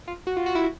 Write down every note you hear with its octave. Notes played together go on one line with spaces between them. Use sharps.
F4
F#4
F4
F#4
E4